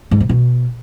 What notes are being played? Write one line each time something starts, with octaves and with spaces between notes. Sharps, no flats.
G#2
C3
B2